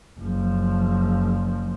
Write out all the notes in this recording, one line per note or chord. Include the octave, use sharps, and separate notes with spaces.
F#1 F3